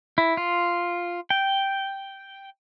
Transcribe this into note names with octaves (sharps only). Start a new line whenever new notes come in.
E4
F4
G5